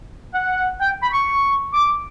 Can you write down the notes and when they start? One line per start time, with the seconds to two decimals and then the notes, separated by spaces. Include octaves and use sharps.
0.34 F#5
0.80 G5
1.03 B5
1.12 C#6
1.74 D6